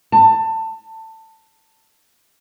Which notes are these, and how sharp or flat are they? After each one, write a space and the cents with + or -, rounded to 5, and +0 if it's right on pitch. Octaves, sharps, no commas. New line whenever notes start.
A5 +20